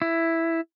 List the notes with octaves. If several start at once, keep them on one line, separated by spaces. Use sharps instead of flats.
E4